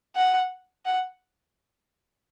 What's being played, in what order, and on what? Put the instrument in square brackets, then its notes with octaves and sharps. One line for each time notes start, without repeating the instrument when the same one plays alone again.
[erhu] F#5
F#5